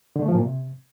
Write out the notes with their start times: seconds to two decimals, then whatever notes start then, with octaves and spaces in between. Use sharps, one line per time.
0.16 D3
0.22 A3
0.28 F3
0.35 A#2
0.41 C3